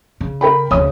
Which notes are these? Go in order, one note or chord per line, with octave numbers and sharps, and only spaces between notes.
C#3
A#4 G5 B5
D2 C#3 C#5 D#6